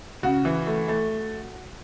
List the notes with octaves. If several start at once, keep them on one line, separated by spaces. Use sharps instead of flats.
C#3 F#4
E3
A3
A3